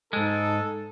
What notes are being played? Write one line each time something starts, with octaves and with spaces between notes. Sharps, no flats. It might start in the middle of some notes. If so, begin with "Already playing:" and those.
G#2 G#3 D#4 A4